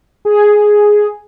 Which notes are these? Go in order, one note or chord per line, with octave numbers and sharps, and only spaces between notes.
G#4